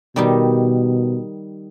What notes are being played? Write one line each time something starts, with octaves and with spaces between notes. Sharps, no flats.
B2 D#3 G3 D#4